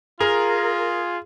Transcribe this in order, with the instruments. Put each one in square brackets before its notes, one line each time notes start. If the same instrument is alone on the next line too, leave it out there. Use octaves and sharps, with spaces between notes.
[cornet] F4 [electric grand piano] G#4 [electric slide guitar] A#4